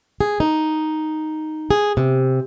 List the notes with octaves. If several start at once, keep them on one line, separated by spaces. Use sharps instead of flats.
G#4
D#4
G#4
C3